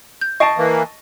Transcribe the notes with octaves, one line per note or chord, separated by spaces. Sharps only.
G6
D#5 A5 C#6 C7 D7
E3 A#3